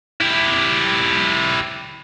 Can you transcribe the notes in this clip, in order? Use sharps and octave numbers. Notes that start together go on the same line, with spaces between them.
E4 G4